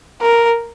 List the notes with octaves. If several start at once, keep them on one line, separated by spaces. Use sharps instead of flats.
A#4